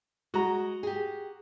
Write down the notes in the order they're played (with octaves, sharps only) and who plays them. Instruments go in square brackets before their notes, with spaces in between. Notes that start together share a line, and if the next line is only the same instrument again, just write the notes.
[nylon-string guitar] G#3 [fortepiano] F#4 A#5
[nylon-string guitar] G4 G#4